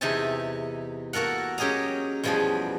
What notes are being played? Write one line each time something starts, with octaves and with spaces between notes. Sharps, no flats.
E2 C3 D#4 E5 G#5 A5
A#3 F#4 A4 A#4 F#5
F#3 C#4 G4 G#4 D#5 A#5
E2 B2 F3 G3 G#4 B5